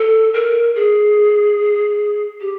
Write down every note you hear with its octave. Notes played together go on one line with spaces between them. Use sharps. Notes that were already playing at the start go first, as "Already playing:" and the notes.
Already playing: A4
A#4
G#4
G4